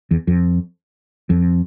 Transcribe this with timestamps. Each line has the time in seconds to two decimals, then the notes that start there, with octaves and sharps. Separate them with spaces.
0.11 E2
0.27 F2
1.30 F2